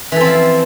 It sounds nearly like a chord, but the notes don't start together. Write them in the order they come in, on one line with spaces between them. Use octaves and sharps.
E3 A4 C4 F3